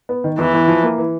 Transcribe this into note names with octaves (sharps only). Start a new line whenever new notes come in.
B3
D#3
E2 E3
E2
F3
A#3
E3